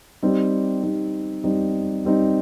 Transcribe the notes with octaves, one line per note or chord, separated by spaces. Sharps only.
G3 C4 D#4
G3 C4 D#4
G3 C4 D#4
G3 C4 D#4